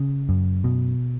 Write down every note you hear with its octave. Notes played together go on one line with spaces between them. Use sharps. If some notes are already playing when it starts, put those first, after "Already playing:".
Already playing: C#3
F#2
B2